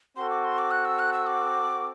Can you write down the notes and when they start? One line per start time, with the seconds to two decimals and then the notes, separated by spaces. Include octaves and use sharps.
0.16 C4 F#4 A4 C6
0.30 D6
0.44 C6
0.58 D6
0.71 F#6
0.85 E6
0.99 F#6
1.13 E6
1.27 D6